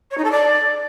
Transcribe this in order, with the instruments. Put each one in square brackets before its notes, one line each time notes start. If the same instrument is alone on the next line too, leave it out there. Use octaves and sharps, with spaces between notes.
[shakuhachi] C#5
D#4
A4
D5